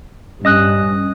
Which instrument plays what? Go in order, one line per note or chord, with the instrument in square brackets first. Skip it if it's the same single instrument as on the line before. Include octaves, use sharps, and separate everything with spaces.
[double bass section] G2 [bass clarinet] C#4 [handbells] D#5 D#6 F#6